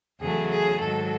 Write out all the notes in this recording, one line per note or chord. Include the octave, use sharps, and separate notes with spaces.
E2 C#3 F#3 A3 G#4
G#4
G#2 D#3 F#3 A4